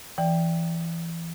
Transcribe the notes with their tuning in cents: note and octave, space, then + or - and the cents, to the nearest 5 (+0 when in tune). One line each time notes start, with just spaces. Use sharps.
E3 +20 D5 +0 G5 +0